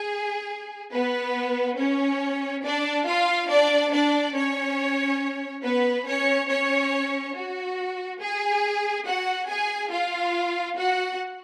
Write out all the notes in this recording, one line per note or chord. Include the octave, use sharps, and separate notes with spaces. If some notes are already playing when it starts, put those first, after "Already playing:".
Already playing: G#4
B3 B4
C#4 C#5
D4 D5
F4 F5
D4 D5
D4 D5
C#4 C#5
B3 B4
C#4 C#5
C#4 C#5
F#4
G#4
F#4 F#5
G#4 G#5
F4 F5
F#4 F#5